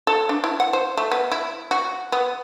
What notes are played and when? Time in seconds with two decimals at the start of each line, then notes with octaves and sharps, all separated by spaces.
0.07 A4
0.29 D4
0.44 E4
0.60 F#5
0.73 C5
0.97 A3
1.11 B3
1.32 E4
1.71 F#4
2.12 B3